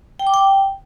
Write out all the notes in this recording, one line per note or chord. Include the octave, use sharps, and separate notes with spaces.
G5
D6
G5